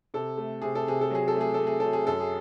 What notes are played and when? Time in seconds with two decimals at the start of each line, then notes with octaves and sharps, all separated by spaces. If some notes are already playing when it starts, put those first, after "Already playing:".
0.14 C3 A4
0.37 A3
0.62 C3 G#4
0.75 A4
0.87 C3 G#4
1.01 A4
1.11 F#3 G#4
1.28 A4
1.35 A3
1.41 G#4
1.54 A3 A4
1.67 G#4
1.80 F#3 A4
1.93 G#4
2.07 F#2 A4
2.20 G#4